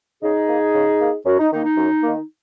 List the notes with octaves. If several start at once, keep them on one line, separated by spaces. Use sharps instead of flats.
C#3 D#4 G#4
A#3
C#3
A#3
F#2 C#4 F#4
D#4
D#3 A#3 D#4
D#4
F#2
D#3 A#3